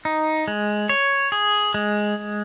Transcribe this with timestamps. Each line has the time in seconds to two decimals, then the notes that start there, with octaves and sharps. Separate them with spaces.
0.05 D#4
0.48 G#3
0.89 C#5
1.32 G#4
1.74 G#3